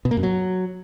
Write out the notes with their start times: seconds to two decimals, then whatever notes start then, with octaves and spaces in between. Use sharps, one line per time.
0.05 B2
0.11 A#3
0.17 F#2
0.23 F#3